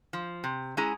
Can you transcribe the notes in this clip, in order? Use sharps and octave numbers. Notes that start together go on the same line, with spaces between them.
F3
C3
G#3 C#4 E4 G#4 A#5